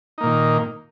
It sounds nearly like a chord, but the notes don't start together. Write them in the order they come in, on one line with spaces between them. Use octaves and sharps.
D#4 A#3 A#2 D#3